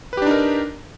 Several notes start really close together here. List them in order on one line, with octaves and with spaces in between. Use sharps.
B4 G4 D4 D#4 A#4